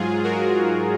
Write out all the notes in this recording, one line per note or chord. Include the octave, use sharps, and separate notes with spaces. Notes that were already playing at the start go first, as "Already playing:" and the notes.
Already playing: G#2 F#3 F4 G#4
F#4 A#4